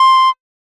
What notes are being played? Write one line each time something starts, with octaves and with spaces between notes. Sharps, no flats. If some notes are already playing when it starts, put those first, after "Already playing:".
Already playing: C6